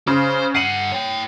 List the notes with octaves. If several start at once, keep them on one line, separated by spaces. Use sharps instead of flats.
C#3 C5
G2 F#5 C7 D#7 F#7
C#5 G5